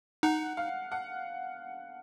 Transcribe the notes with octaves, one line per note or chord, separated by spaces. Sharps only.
D#4 F#5
F5
F#5